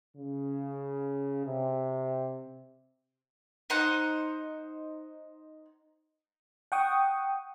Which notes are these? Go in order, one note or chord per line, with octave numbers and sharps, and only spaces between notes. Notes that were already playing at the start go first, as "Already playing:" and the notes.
C#3
C3
D#4 C5 F#5
F#5 G5 C#6 D#6